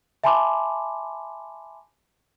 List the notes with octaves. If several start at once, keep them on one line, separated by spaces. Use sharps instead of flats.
E5 G#5 A5 B5 C6 D6